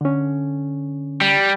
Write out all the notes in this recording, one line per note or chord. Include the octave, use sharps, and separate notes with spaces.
D3 C#4
G3